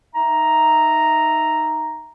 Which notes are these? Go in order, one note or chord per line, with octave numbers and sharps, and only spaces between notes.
D#4 E5 A#5